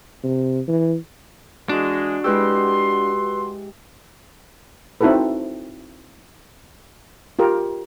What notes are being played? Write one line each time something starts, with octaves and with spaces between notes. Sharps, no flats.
C3
E3
E3 G#3 D4 F#4
G#3 E4 F#4 G4 B4 C6 E6
C4 D#4 E4 F#4 A4 B4
F4 G4 A#4